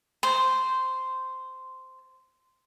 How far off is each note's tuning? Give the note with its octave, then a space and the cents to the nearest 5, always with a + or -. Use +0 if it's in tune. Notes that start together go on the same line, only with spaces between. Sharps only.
C5 -10